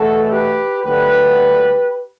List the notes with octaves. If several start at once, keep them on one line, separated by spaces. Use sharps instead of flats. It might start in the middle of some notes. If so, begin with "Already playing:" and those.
Already playing: E2 B2 A3 F#4 A4
G4 B4
D2 D3 F#3 B3 G4 B4